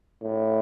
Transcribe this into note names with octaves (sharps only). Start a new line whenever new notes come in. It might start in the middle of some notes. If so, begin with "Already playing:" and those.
A2